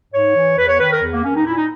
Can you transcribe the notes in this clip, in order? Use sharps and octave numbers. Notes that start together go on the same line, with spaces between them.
G#2 C#5
E3
E2 B4
C#5
D#3 B4
A#4
E2
A#3
D#3 C#4
D#4
A#2 E4
D#4